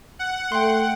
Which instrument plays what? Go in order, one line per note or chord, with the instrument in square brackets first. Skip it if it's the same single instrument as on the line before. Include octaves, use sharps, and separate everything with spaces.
[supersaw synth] F#5
[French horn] A3 [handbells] G5 C6